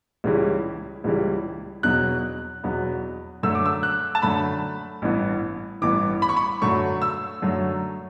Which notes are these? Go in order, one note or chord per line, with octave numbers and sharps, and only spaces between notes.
C#2 C#3 E3 G3
C#2 C#3 E3 G3
E2 B2 F#3 B3 F#6
E2 B2 F#3 B3
F#2 D3 A3 E6
D6
E6
F#6
A5
F#2 D3 A3 B5
A1 G2 E3 B3
A1 G2 E3 B3 D6
B5
C#6
B5
F#2 D3 F#3 A3 C#6
E6
F#2 D3 F#3 A3